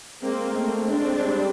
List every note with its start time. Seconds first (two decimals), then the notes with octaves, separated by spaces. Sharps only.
0.23 G#3 A#3 C4
0.55 A3 A#3 C4
0.88 G#3 C4 D4
1.22 G3